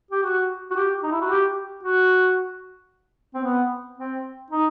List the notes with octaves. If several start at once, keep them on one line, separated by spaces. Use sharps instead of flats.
G4
F#4
F#4
G4
D#4
E4
F#4
G4
F#4
C4
B3
C4
D#4